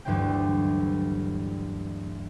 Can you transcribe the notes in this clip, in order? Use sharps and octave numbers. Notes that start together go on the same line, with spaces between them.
D2 G2 E3 F#3 C4 G5